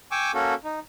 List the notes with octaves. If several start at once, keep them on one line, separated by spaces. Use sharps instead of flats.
G5 G#5 C#6 D6 E6
A#3 C#4 F#4 A4
D#4